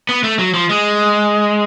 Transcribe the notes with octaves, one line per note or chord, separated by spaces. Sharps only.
B3
A3
F#3
F3
G#3